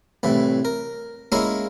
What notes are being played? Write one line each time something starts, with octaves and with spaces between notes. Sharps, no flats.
C2 A2 E3
A#4
G#3 A#3 C#4 E4 A#4 F5